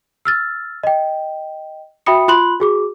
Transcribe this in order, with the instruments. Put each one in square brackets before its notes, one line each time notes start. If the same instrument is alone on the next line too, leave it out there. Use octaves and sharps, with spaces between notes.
[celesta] E6 F6 A6
D#5 G5
F#4 E5 G5 B5 D#6 C#7
F4 B5 C6 F#6 F#7
F#4 G#4 D6